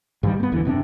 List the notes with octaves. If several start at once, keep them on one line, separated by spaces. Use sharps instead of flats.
G2 D#3 G3
A3 B3
F1 D2 D3 E3
F#1 C3 C4 D4